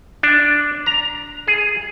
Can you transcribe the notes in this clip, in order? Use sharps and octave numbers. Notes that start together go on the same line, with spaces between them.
D4
A#5
G#4